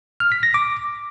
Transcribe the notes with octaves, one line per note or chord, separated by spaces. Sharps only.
F6
B6
A#6
D6